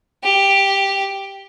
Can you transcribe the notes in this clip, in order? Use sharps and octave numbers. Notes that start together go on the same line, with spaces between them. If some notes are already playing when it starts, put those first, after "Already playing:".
G4